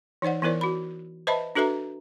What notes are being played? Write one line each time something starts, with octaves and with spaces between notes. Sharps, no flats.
E3 D#4 C5 D5 F#5
E3 B3 E4 A#4 C5 D5
F#4 B5
B4 C5 D#5 E5 A5 B5
D4 F#4 A4 B4 E5 A#5